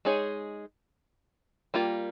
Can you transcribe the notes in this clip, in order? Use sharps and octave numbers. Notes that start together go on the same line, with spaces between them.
G#3 D#4 G#4 C#5
G3 A#3 F4